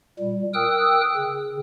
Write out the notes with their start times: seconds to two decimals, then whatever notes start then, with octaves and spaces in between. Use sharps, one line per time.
0.19 A#2 G3
0.54 A#4 G5 D#6 E6 F#6
1.16 C#3